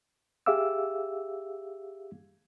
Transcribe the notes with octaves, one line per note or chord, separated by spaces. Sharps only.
G4 G#4 E5 F5 D6 E6